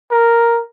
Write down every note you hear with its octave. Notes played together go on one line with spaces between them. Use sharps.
A#4